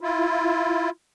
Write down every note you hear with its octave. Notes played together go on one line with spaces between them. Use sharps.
E4 F4